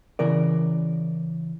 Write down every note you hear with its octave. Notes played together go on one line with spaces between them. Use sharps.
C#3 E3 A#4 D5